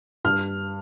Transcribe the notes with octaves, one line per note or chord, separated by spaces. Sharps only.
G2 F6